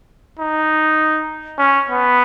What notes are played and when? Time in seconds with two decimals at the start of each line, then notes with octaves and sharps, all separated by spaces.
0.39 D#4
1.59 C#4
1.89 B3